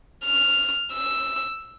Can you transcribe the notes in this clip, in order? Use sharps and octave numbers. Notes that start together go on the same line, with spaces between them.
F6
E6